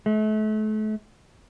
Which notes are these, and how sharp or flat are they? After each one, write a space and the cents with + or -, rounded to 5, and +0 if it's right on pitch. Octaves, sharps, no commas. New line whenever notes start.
A3 -35